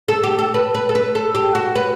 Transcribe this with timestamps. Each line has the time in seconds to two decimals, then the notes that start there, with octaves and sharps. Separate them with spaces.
0.08 A4
0.23 G4
0.39 A4
0.54 B4
0.74 B4
0.89 A4
0.95 B4
1.15 A4
1.35 G4
1.55 F#4
1.75 B4